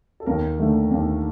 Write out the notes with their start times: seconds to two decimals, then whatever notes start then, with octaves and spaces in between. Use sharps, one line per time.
0.20 A4
0.26 D#2 A#4
0.59 D3 A3
0.91 D#2